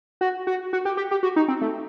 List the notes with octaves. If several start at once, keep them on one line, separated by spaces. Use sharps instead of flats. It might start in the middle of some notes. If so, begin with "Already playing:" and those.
F#4
F#4
F#4
G4
G4
G4
F#4
D#4
C4
A3